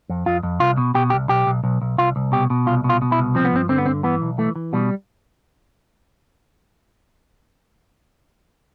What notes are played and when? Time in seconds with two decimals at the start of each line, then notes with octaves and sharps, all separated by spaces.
0.09 F2
0.26 F2 F4
0.43 F2
0.60 C2 F4
0.77 B2
0.94 B2 G4
1.10 C2 G4
1.29 B1 G4
1.47 B1
1.64 B1
1.82 B1
1.98 C2 F4
2.16 C2
2.32 B2 G4
2.50 B2
2.66 C2 F4
2.84 B2
2.89 F4
3.02 B2
3.12 E4
3.19 C2
3.35 F3 C4
3.45 B3
3.53 G2 C4
3.69 D3 C4
3.78 B3
3.86 G2 C4
4.04 E3 B3
4.22 B1
4.38 E3 A3
4.56 E3
4.73 B2 G3